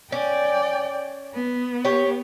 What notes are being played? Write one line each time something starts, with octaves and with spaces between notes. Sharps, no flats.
C#4 D5 G5
B3
G4 C#5